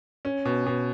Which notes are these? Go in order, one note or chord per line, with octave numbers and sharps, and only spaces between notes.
C#4
B2
B2